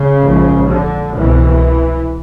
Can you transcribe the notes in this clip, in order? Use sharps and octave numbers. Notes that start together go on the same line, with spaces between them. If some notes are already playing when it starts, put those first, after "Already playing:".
Already playing: C#3
A#1 G#2
D3
C2 B2 E3